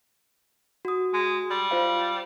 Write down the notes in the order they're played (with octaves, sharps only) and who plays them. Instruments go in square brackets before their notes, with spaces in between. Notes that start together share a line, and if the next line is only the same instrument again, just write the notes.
[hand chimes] F#4 D#6
[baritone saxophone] G#3
G3
[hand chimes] F4 C5 F5